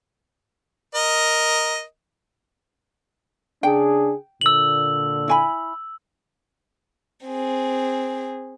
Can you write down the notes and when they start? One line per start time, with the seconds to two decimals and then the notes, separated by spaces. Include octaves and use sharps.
0.95 A#4 D#5
3.63 C#3 D4 G#4 G5
4.41 A#2 D3 E6 F#7
5.28 E4 G#5 B5
7.26 C4 G#4